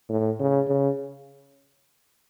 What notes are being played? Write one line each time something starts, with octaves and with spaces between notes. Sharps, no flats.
A2
C#3
C#3